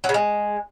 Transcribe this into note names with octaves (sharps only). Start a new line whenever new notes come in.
F#3
C#3
G#3